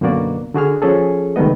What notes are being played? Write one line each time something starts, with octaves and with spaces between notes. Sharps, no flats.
F#2 B2 D3 A#3 F#4 D5
D3 F#4 G#4 F6
F3 C#4 G#4 A4
C#2 D#3 G3 A3 B3 D#5